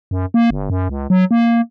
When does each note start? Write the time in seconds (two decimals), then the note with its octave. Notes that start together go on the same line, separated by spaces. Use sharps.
0.11 F#2
0.34 A#3
0.50 G1
0.70 F#2
0.89 C#2
1.10 F#3
1.31 A#3